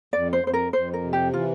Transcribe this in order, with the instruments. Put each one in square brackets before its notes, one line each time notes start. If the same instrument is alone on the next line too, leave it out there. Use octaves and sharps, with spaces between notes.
[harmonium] F2 [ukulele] D5
[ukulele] C5
[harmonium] F2 [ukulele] C5
[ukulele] A#4
[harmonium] F2 [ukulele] C5
[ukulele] A#4
[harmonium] C3
[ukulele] G4
[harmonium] E3 [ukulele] F4